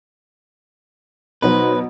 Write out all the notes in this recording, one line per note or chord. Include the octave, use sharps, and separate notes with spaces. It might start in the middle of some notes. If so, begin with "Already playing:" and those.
B2 F#3 D#4 B4 C5